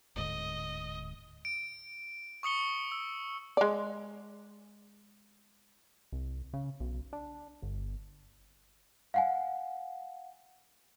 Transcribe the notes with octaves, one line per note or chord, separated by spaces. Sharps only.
D1 G#2 D3 D#5
D7
C#6 D#6 C#7 G7
E6
G#3 D5
C2
C#3
B1
D4
G1
F5 F#5 G#5